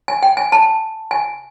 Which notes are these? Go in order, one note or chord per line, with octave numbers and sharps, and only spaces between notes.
G#5
G5
G#5
A5
G#5